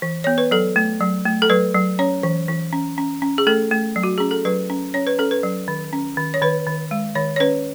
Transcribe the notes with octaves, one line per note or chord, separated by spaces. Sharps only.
E3
B3 C#5
B4
F#3 A4
A3
F#3
A3
A4
F#3 B4
F#3
C#4 C#5
E3
E3
C#4
C#4
C#4
G#4
A3 A4
A3
F#3
F#4
C#4 G#4
A4
F#3 B4
C#4
C#4 C#5
B4
C#4 A4
B4
F#3
D#3
C#4
D#3
C#5
D#3 B4
D#3
G#3
D#3 C#5
C#5
C#4 B4